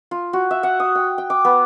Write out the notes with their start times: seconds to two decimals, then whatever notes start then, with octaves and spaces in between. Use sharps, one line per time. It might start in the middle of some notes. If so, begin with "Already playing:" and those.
0.11 F4
0.33 F#4
0.51 E5
0.63 F#5
0.80 D#6
0.95 G5
1.18 G5
1.30 D6
1.45 B3